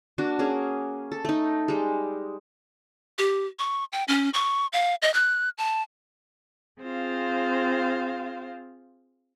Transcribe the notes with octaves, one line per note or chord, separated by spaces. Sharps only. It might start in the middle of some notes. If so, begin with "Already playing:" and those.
A#3 D4 F#4
A#3 C#4 G#4
A4
A3 D#4
G3 G#3
G4
C#6
G5
C#4
C#6
F5
D#5
F#6
A5
C4 F4 G#4 C5 F5